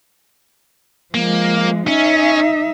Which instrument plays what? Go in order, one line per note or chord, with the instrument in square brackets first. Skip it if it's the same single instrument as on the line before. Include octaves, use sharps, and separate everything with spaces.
[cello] F3 G#3 [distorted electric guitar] A#3
[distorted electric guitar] C#4 [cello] D#4 E5